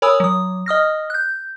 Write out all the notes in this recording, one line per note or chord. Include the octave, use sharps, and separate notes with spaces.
A#4 C#5 G#5 B5 D#6 E6
F#3 D#6
D#5 D#6 F6 A#6
F#6 G6